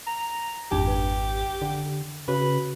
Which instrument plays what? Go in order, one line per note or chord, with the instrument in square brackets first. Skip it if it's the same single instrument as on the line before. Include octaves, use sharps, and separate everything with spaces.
[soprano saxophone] A#5
[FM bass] G#1 [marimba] F2 D4 [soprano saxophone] G4
[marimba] B4
[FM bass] D3
[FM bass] C#3 [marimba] F#4 [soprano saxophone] B4